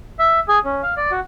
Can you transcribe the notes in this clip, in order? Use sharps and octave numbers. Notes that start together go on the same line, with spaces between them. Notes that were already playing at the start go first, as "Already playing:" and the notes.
E5
G#4
C#4
F5
D5
F#4